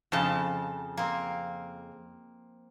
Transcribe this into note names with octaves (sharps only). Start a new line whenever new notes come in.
F2 C#3 F3 A5
A#3 C4